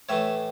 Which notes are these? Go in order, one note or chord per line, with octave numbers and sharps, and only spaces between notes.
A2 E3 A3 C#5 E5